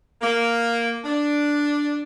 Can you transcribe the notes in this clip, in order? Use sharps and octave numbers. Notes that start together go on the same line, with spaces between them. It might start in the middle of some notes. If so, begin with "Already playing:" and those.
A#3
D4